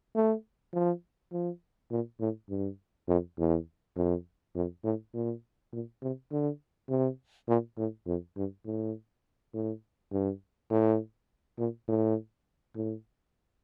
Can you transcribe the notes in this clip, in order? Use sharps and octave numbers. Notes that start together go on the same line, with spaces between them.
A3
F3
F3
A#2
A2
G2
F2
E2
F2
F2
A2
A#2
A#2
C3
D3
C3
A#2
A2
F2
G2
A2
A2
G2
A2
A#2
A2
A2